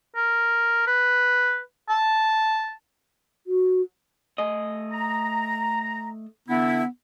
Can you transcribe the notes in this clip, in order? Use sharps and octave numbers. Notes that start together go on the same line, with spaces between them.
A#4
B4
A5
F#4
A3 D#5
A#5
D3 B3 D4 E4